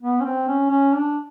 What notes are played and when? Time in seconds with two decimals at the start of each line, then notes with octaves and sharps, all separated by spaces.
0.01 B3
0.20 C#4
0.24 C4
0.48 C#4
0.70 C#4
0.93 D4